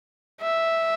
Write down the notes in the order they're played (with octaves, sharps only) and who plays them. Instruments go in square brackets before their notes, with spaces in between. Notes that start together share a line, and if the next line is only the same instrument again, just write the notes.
[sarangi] E5